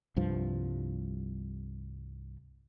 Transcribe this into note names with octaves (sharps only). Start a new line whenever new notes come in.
C2 G2 F3